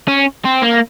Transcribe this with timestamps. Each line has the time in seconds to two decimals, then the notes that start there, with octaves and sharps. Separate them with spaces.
0.08 C#4
0.45 C4
0.62 A#3